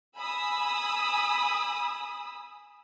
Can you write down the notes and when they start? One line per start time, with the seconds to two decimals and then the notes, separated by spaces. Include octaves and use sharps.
0.16 G#5 B5 D#6 E6